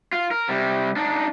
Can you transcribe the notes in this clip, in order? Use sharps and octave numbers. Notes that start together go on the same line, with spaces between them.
F4
A#4
C3 G3
D4 D#4